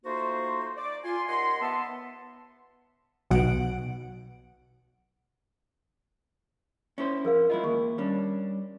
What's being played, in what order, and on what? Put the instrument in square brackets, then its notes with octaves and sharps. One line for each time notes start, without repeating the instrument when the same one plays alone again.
[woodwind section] A3 A#3 D#4 F4 F#4 C5
D5
F4 G#5 C6
D#2 D#5 F#5 C6
B3 E5 A5
[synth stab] B1 B2 F#5 D7
[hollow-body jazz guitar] C#4 E4 C5
[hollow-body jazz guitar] F2 [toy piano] G#4 A#4 F5
[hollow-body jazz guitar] G#3 E4 F4 [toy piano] D#5
[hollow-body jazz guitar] D#2 [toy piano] C#6
[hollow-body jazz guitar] G3 C#4 D4